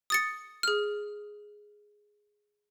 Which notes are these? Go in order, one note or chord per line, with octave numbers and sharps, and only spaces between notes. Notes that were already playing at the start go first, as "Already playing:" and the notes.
D#6 A6 C#7
G#4 F6